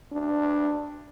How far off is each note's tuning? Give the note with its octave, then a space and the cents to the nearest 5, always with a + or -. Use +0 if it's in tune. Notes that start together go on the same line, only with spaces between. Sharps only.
D4 +10